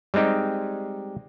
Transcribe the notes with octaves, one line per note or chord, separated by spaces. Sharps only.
G3 G#3 C4 D#4 G4